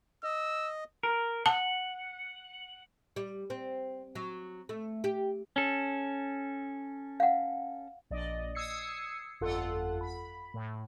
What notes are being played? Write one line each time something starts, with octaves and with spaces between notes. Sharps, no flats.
D#5 E6
A#4
F#5 A5
G3
C4
F#3
A3
G4
C#4 A4
F5 F#5
A#1 D5 D#5
D#6 E6 G#6 C7 C#7
G1 F2 F4 A4 F#5
B5
A2